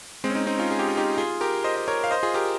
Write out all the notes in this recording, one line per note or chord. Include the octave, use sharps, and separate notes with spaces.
G#3 C4
C#4
C4 D#4
C4 D#4
C#4 F4
G#4
G4
F4
D#4 G4
F4 G#4
G4 A#4
C5 D#5
D#5
A#4 C#5
F5
C5 D#5
F4 G#4
G4 A#4